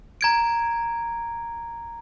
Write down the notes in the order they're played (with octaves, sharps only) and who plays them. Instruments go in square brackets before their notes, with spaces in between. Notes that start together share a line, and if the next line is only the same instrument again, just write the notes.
[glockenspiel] A#5 G#6 D7